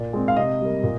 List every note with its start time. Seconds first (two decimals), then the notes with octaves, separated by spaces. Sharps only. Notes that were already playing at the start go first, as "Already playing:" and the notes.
Already playing: A#2 D5
0.13 G#3 C4
0.28 F5
0.37 C3 D#5
0.61 G3 A#3
0.83 A#2